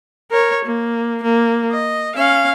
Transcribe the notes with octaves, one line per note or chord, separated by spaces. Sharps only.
A#4 C#5
A#3
A#3
D#5
C#4 F5